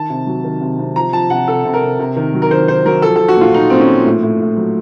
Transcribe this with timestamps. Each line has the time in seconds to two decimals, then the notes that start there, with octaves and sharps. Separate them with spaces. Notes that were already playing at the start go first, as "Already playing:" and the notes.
Already playing: D#3 A5
0.10 C3
0.27 F#3
0.44 D#3
0.61 C3
0.79 C3
0.96 F3 A#5
1.13 F3 A5
1.30 C3 F#5
1.47 C3 A4
1.65 C3
1.74 A#4
1.83 C3
1.99 C3
2.16 D#3
2.34 F#3
2.42 A#4
2.51 D#3 C5
2.68 D#3 C5
2.86 F#3 A#4
3.02 F3 A4
3.16 F3 A4
3.28 F#4
3.37 A#2 F4
3.54 A#2 D#4
3.70 A#2 C4
3.80 C#4
3.88 F3
4.05 A2
4.23 A2
4.41 A2
4.57 F#3